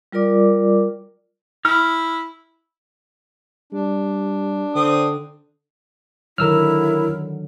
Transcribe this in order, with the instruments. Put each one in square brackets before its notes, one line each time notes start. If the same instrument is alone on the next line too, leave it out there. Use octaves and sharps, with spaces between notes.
[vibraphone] G3 F4 A#4 D5 D6
[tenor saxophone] E4 [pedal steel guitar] F6
[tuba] G3 [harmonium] D4
[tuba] D3 [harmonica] C4 D#6
[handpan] D3 D#3 F#3 [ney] E4 [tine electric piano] A#4 E6 F6